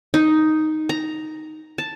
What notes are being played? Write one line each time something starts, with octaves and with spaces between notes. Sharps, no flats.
D#4
A#5
A5